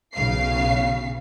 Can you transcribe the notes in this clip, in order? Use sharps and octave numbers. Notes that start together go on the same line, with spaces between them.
B1 C#3 F5 C7